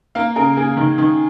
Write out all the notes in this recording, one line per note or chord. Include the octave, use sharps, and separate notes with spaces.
A#3 F5
C#3 A#4
A#3 G#4
D#3
D#3